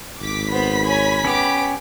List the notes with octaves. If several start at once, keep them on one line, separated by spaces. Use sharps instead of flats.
G#1 D6 B6
B3 C5 B5 B6
C#5 G#5
B3 C#4 G4 D6